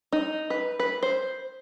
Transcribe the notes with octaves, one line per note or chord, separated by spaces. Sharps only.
D#4
B4
B4
C5